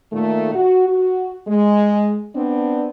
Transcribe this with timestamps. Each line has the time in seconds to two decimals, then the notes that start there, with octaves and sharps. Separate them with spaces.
0.12 A#2 D#3 A3
0.54 F#4
0.88 F#4
1.47 G#3
2.35 B3 C4 D4